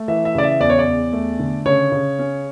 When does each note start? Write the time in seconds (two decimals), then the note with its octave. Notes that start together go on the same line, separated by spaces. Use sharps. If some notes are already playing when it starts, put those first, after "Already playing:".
Already playing: A3
0.08 E3 E5
0.25 E5
0.35 C#3 D5
0.43 E5
0.60 E2 D5
0.70 C#5
0.79 D5
0.86 E2
1.13 A3
1.39 D3
1.66 C#3 C#5
1.92 C#3
2.19 C#4